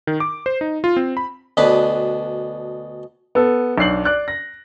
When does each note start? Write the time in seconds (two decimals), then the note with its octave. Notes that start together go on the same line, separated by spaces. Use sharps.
0.07 D#3
0.20 D6
0.46 C5
0.61 D#4
0.84 F4
0.96 C4
1.17 B5
1.57 D2 B2 D4 B4 A5 B5
3.35 B3 A4
3.78 B1 D4 C7 F#7
4.05 D5 F#6
4.28 A#6